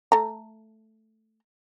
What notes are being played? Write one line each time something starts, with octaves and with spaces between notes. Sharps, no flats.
A3 A#5